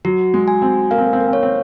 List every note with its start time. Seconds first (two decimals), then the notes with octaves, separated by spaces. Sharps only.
0.05 F#3 F#4
0.34 G#3
0.48 G#5
0.62 C4
0.91 A#3 F5
0.98 C4
1.06 A#3
1.13 C4
1.20 A#3
1.28 C4
1.33 A#3 C#5
1.43 C4